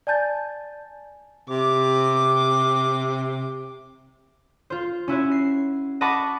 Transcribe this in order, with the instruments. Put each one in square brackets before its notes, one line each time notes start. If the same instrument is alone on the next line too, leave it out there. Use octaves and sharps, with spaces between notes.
[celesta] D5 G#5 A5 G6 A6
[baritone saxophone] C3 [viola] D6
[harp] F4 C5
C#4 E4 F#4 C#5
C7
D#5 F#5 A5 B5 C#6 D6